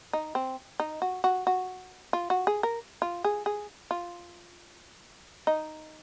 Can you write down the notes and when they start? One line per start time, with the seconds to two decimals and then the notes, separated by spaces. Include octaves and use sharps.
0.13 D#4
0.35 C4
0.80 D#4
1.02 F#4
1.24 F#4
1.47 F#4
2.13 F4
2.30 F#4
2.47 G#4
2.63 A#4
3.02 F4
3.24 G#4
3.46 G#4
3.91 F4
5.47 D#4